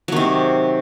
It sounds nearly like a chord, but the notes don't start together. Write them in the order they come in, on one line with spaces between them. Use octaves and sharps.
F#3 D#3 C3